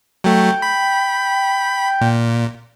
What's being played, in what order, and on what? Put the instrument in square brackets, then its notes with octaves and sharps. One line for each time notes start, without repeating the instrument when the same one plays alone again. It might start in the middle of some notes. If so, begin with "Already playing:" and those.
[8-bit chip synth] F#3 A3 [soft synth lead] G5
[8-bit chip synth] B5
A#2